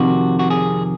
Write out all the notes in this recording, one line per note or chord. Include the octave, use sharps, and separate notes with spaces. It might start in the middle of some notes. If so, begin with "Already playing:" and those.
Already playing: F2 C3 D#3 F#4
F#4
G#4